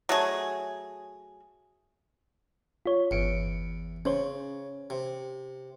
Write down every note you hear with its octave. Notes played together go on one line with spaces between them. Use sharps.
F#3 A3 G#4
F4 C#5
G1 E2 C#7 D7
C#3 C#4 C5 C#5
C3